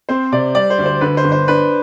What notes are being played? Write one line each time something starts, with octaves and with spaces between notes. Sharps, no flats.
C4 C5
C3 D5
G3 D5
C5
D2
C5
D3 B4
C5
G1
C5
D4 B4